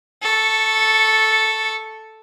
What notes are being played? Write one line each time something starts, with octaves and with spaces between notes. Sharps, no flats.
A4 C#6